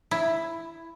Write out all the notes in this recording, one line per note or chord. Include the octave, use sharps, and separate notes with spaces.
E4